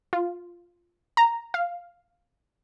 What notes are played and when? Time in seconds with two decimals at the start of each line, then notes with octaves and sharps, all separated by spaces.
0.13 F4
1.17 A#5
1.54 F5